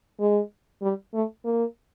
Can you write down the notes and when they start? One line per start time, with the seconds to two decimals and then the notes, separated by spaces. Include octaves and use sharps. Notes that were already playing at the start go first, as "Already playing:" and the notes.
0.20 G#3
0.82 G3
1.14 A3
1.45 A#3